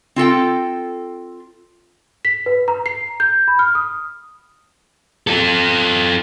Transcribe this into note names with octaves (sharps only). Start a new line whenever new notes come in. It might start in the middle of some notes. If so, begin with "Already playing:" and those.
C4 F4 A4 G5
B6
B4
A#5
C7
G6
B5
F6
D#6
F4 A4